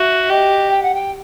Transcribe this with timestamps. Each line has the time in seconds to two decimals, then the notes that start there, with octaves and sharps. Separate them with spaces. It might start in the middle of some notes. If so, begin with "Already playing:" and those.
Already playing: F#4 E5
0.29 G4 D#5
0.70 G5
0.82 F#5
0.94 G5